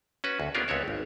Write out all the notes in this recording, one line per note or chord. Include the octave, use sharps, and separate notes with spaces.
C#4 F#4 B4
D2
B3 C#4 D4 F4 G4 A#4
C#2 B3 C4 C#5 E5
G#1